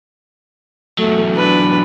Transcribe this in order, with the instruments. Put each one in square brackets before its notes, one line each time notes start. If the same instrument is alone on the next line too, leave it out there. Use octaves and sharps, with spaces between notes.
[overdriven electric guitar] E2 F#3 [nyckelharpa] A3
[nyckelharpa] D4 B4